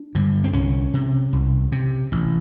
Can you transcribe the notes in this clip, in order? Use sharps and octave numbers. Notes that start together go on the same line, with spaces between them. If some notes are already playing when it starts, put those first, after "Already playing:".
Already playing: D4
G2 D3
C4
C2 C#4
C3
C2
C3
A1